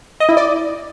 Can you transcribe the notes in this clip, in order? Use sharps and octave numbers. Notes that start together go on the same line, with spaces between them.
D#5
E4
D5